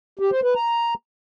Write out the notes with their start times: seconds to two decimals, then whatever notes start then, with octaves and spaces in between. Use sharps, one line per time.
0.19 G4
0.31 C5
0.43 B4
0.55 A#5